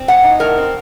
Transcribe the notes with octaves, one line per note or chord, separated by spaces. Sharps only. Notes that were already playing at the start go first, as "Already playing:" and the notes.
Already playing: C4
A2 F#5
D#4
A2 A#4
C4